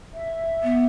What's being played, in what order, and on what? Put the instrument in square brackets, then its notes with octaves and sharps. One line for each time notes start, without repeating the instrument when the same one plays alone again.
[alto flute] E5
[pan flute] B3